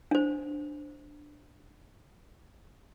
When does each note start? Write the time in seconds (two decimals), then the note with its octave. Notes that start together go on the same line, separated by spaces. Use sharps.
0.11 D4 C5